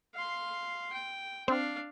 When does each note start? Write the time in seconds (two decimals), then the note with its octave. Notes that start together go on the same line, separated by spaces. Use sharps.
0.14 F5 C6
0.93 G5
1.48 C4 D4 F5